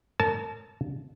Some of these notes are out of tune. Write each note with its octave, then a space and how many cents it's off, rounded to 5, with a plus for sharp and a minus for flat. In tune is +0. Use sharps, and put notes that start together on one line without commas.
A#4 -40 A5 -25